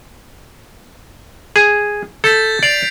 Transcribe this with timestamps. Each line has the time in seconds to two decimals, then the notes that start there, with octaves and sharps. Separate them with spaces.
1.56 G#4
2.24 A4 G6 A6 B6
2.63 D5 C7 D7 F7